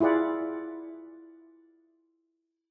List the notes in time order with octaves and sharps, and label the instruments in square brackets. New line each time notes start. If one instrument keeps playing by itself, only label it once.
[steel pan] E4 F4 G#4 D5 F#5